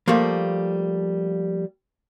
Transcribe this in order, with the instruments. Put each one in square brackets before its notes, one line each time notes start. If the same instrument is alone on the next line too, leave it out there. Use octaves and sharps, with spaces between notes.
[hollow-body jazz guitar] F3 G3 A3 A#3